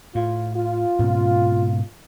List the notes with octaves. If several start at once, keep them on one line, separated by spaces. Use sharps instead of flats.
A2 F4
F4
G#2 B2 C#4